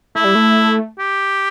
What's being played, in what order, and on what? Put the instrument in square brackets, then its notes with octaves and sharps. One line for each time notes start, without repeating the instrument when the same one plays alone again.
[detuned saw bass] A3 [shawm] E4
[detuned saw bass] G3
A3
[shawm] G4